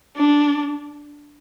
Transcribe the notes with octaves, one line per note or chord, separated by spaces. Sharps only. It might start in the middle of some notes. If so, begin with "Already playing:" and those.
D4